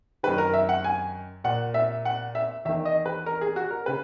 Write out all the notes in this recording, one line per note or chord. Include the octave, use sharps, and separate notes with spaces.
F#2 D#3 B4
A#4
E5
F#5
G#5
A#2 F#5
E5
F#5
E5
E2 D#3 E5
D#5
B4
A#4
G#4
F#4
A#4
C#3 B4